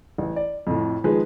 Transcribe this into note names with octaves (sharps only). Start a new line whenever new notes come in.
A1
D5
F2 A2
D#3 F3 G#3 G#4 B4